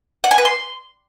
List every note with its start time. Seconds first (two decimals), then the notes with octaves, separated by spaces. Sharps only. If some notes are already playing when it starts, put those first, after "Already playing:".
0.24 F#5
0.31 G#5
0.38 B4
0.45 C6